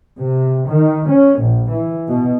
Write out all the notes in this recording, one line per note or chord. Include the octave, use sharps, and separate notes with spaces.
C3
D#3
C#4
A#1
E3
B2